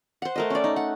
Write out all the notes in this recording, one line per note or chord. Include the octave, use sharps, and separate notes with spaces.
C5 F#5
A3 A#4 D#5
C#4 D5
D#4
F#5